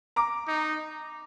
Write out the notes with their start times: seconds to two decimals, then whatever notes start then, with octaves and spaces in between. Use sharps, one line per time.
0.16 A#5 D6
0.48 D#4